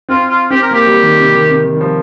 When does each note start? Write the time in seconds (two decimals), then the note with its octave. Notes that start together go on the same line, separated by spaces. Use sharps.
0.09 C4 F4
0.30 F4
0.50 C4 G4
0.62 A#4
0.71 A#3 G4
0.87 G3
1.03 D#3
1.18 C3
1.34 D#3
1.49 C3
1.64 D#3
1.76 G3
1.81 F3